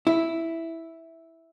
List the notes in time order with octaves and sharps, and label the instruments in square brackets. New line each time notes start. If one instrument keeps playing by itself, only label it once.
[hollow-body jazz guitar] E4